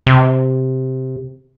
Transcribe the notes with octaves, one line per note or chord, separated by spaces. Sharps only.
C3